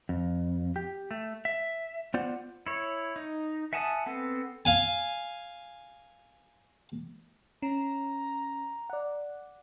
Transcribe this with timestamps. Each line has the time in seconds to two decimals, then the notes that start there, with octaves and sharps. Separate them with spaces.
0.09 F2
0.76 G4
1.11 A3
1.45 E5
2.14 B3 F4 C5 D5 F#5
2.67 E4 C#5
3.16 D#4
3.73 E5 F#5 G#5 A5 D#6
4.06 B3 C4 A4
4.65 F5 G#5
7.62 C#4 A#5
8.90 D5 F#5